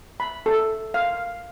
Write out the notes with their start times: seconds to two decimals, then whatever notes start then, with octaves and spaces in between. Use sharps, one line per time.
0.20 B5
0.46 A4
0.94 F5